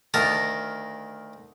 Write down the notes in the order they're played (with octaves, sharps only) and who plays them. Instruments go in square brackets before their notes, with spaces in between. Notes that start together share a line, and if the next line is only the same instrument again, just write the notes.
[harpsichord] D2 D#3 A#4 A5 A#5